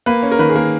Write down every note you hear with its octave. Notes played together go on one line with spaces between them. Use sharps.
A#3 B4
C#4
A#4
D#3 B4
G#4
A#3 A#4